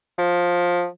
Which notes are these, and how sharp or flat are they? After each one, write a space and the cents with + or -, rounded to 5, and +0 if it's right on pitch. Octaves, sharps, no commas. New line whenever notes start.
F3 +15